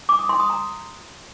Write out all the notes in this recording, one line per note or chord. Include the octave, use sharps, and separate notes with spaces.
D6
D#6
C6
D#6
A#5